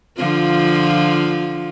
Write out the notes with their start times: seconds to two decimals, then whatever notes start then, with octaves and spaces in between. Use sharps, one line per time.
0.17 D3 F3 F4